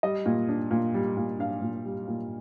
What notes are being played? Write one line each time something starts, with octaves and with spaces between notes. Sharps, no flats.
G3 D#5
A#2
D4
A#2
G3
A#2
D4 F5
A#2
G3
A#2